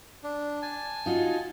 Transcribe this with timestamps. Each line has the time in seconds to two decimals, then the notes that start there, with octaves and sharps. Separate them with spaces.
0.24 D4
0.62 G#5 A5
1.06 D#4 F4 F#4